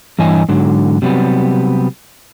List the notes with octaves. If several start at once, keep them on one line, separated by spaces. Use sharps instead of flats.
G2 E3 C#5 D#5 G#5
G#2 D3 F#3
C3 F#3 G3 B3